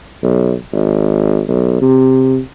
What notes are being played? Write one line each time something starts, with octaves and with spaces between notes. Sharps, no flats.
B1
G#1
B1
C3